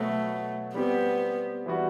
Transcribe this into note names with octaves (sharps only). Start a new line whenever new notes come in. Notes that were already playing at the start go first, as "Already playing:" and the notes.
Already playing: B2 F#3 A3 B3 F#4
G3 B3 C4 G4
E3 G3 B3 F#4